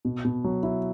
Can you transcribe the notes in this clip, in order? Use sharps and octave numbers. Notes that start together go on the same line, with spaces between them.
B2
B2
F#3
E4